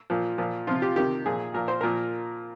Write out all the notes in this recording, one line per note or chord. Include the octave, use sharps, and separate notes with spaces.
A#2 F3
A#2 F3
C3 F3 F4
G4
C3 D#3 G4
A#2 F3 G#4
A#2 F3 A#4
C5
A#2 F3 A#4